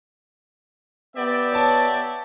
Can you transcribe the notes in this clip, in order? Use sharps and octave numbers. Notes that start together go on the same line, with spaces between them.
B3 G4 D5 E5
C#5 A5